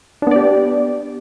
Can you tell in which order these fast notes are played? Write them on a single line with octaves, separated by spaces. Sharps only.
D4 B3 D5 G4